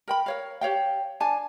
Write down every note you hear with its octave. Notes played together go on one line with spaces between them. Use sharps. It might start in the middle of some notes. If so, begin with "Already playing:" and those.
A#4 G5 B5
A#4 C#5 F5
G4 C#5 F5 G5
D4 G#5 A5